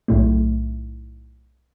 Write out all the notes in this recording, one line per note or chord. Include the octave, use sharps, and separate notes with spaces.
B1 A2 A3